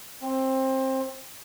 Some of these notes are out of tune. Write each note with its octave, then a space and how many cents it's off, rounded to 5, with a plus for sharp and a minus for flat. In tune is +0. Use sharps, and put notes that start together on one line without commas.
C4 +20